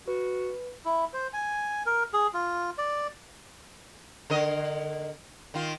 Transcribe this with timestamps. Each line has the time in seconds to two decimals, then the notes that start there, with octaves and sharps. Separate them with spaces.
0.08 F#4 B4
0.85 E4
1.13 C5
1.33 G#5
1.86 A#4
2.13 G#4
2.34 F4
2.78 D5
4.30 D3 A#4 D#5
5.54 D#3 F4